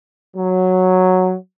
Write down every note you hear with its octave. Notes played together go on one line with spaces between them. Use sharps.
F#3